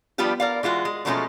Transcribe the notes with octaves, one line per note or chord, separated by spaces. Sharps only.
F3 G3 B3 D4 F4 G4
A#4 D5 F5
E3 G#3 F4 F#4
G#3
B2 F3 F#3 G#3 A3 C#4